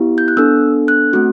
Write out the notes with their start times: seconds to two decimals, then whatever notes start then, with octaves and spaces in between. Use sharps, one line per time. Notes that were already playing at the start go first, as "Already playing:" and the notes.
Already playing: B3 E4 G4
0.18 G6
0.28 F#6
0.37 B3 D4 A4 E6
0.88 F#6
1.13 A3 C4 F#4